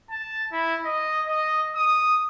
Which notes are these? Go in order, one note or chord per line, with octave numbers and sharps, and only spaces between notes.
A5
E4
D#5
D#5
D#6